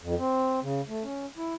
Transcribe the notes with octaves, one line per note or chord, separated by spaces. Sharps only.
F2
C4
C#3
A3
C#4
E4